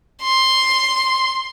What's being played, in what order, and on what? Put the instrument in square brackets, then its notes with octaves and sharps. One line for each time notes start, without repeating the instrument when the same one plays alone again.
[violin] C6